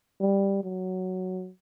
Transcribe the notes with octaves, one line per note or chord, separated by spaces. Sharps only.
G3
F#3